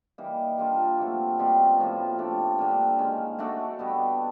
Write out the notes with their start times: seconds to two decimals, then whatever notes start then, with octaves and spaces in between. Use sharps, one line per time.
0.18 E3 G3 A#3 D#4
0.58 G3 A#3 D4 F4
0.98 A#2 F#3 A3 C4
1.38 B2 G3 C4 F4
1.78 A2 F3 A#3
2.18 A3 D4 G4
2.59 D3 G3 A#3
2.99 D#3 G#3 C#4
3.39 A3 D4 F#4 A4
3.79 B2 G3 B3